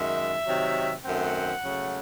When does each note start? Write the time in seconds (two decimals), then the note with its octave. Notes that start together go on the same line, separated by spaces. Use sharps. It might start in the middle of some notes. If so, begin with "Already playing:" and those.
Already playing: F#2 D#3 G#3 E5
0.47 C3 D#3 F#3
1.05 F#2 D#3 A3 C4 F#5
1.63 C#3 F#3 A3